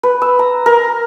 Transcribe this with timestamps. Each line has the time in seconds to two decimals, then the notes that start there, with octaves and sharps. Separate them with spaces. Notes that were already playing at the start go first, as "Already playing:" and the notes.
0.03 B4
0.22 E6
0.39 A#5
0.66 A#4